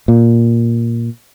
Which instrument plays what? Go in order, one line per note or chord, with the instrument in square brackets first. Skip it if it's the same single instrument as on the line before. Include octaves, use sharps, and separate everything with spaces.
[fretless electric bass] A#2